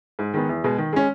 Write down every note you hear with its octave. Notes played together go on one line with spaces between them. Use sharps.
G#2
D#3 G#3 B3
E2
B2 G#3
D#3
G#3 C#4